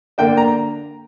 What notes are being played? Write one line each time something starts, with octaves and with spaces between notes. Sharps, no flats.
D3 A#3 D4 G5
A#5